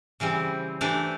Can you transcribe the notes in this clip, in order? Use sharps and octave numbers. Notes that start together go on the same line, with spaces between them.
C#3 E3 G3 C4
E3 A3 D4 G4